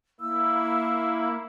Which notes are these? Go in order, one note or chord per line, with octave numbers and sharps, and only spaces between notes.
A#3 E4 E6